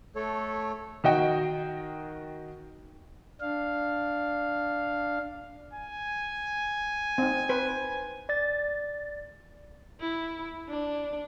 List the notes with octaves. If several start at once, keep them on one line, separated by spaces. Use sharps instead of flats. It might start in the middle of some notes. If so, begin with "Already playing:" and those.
A3 A4 C#5
D#3 F#4 D#5 G5
D4 F5
G#5
C4 D#4
B4 C5
D5 A6
E4
D4